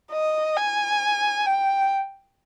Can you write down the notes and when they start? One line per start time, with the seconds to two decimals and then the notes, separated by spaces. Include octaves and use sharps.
0.12 D#5
0.57 G#5
1.46 G5